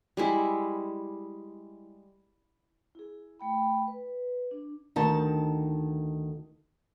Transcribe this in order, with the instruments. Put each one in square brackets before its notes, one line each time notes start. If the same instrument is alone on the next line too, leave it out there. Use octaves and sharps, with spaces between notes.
[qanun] G3 G#3 E4
[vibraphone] E4 G#4
A3 G5 B5
B4
D4
[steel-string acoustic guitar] D2 D#3 A5